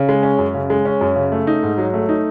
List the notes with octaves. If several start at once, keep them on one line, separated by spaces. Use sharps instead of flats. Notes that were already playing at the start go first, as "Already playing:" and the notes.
Already playing: C#3
G#3
C#4
F#2
C#3
G#3
C#4
F#2
C#3
A3
D#4
G#2
F#3
A3
D#4